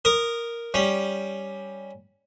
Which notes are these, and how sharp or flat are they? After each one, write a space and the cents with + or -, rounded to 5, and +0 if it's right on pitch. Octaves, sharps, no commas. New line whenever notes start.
A#4 +0 D#6 -15
G3 +0 C#4 +0